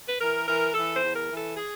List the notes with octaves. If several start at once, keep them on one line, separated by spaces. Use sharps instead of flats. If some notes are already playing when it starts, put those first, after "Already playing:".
B4
E3 A#4
E3 A#4
E3 A4
C5
E2
A#4
E3
A4
G#4